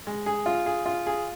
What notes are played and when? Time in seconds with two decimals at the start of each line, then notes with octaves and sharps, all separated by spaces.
0.07 G#3
0.26 G#4
0.46 F4
0.66 G#4
0.86 F4
1.07 G#4